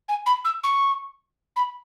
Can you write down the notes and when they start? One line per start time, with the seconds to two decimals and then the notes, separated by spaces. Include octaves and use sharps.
0.08 G#5
0.26 B5
0.45 E6
0.63 C#6
1.56 B5